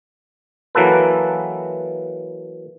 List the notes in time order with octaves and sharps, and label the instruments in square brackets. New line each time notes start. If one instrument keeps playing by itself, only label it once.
[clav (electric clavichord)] E3 F#3 A#3 A4 B4